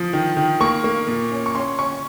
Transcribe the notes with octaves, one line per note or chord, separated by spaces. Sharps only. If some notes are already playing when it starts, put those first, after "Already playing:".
Already playing: F3 D#6
D#3
D#3
A#3 C#6
A#3
A#2
C#4
C#6
C#4 C6
C#4 C#6